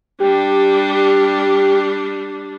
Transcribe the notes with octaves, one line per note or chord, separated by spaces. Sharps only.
G3 D4 G4